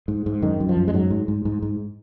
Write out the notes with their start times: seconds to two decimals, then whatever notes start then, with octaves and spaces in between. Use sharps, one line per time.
0.08 G#2
0.26 G#2
0.42 F#2 D#3
0.60 F#2
0.69 F3
0.77 F#2
0.88 G#3
0.93 G#2 F#3
1.10 G#2
1.28 G#2
1.45 G#2
1.62 G#2